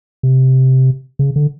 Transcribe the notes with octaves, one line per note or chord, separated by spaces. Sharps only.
C3
C#3
D3